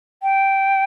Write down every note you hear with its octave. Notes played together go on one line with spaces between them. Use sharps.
G5